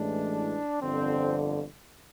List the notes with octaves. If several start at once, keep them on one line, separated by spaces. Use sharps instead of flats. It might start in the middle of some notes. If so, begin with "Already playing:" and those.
Already playing: A1 A2 E3 G#3 D4
G1 F2 D3 C4